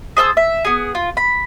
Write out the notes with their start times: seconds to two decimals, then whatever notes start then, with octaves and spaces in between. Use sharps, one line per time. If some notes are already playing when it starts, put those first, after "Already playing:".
0.17 G#4 C5 A5 E6
0.37 E5
0.65 B3 G#4
0.95 F4
1.17 B5